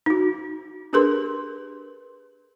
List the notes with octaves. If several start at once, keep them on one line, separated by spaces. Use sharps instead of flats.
D#4 F#4
D4 G4 G#4 A#4 B4 C6